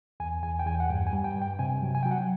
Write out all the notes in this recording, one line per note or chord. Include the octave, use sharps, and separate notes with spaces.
E2 G#5
E2 G#5
G5
E2 G#5
F#5
G2 G5
G#5
G3
G5
G2
G5
C3 G#5
F#3
G#5
F#3 G5
F#5